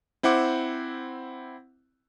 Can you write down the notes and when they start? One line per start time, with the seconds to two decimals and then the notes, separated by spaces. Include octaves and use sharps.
0.23 C4 E4 C5 F#5 D6